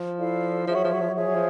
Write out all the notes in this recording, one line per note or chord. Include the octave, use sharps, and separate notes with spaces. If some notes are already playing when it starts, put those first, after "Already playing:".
Already playing: F3
E4 A4 D5 F5
F3 G#4 C#5 E5
F#3
F3
F#3
F3
F#3
F3 G#4 C#5 E5
F#3
F3